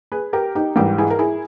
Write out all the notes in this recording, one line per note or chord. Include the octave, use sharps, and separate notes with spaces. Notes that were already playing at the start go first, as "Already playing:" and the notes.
G#4 B4
G4 A#4
D#4 G4
G#2 E3 G3 G4 A#4
E4 G#4
A#4
E4 G#4